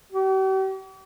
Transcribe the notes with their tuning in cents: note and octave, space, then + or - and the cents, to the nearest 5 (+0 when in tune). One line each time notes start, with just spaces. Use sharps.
G4 -45